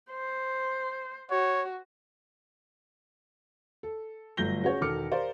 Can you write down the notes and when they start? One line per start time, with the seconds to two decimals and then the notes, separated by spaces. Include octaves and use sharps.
0.11 C5
1.31 F#4 C#5
3.83 A4
4.37 G1 F#3 A3 G6 A#6 G7
4.63 C#4 F#4 G#4 C#5
4.81 E1 D#3 A4 D6 F6 C#7
5.11 G4 A#4 C5 D5 F5